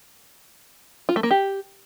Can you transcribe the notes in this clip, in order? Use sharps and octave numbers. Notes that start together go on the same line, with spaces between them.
F4
A3
A#3
G4